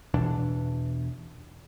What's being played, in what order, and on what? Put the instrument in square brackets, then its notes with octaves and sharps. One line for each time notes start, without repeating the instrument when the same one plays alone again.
[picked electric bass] E2 B2 E3 D4